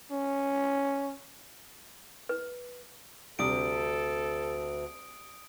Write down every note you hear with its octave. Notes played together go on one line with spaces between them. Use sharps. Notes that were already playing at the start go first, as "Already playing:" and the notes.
C#4
B4
D2 C3 G3 D4 A4 D#6 D7